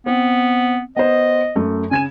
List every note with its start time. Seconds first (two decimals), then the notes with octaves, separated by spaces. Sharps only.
0.06 B3 C4
0.97 B3 C5 D#5
1.56 F#2 A3
1.91 C#3 G#5 G#6 E7